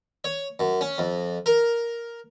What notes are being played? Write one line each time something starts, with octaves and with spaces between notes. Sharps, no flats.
C#5
F#2
C#4
F2
A#4